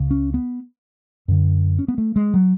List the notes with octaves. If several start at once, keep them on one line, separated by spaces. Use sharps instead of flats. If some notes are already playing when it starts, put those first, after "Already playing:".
Already playing: C#2 C#3
C#4
B3
F#2 D3
C#4
B3
A3
G#3
F#3